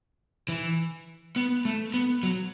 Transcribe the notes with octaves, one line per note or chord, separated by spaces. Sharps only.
E3
B3
A3
B3
F#3